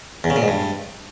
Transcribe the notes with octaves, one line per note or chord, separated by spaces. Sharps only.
E2
C#3
A#2
G#2
G2